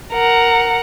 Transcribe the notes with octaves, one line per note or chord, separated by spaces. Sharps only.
A#4 F#5